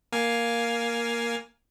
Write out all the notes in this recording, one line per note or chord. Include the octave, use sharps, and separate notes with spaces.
A#3 F5 G#5